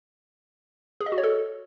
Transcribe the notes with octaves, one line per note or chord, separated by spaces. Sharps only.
G#4
D#5
F#4
C#5
A4